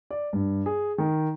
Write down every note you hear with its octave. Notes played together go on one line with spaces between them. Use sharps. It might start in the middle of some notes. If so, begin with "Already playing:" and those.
D5
G2
G#4
D#3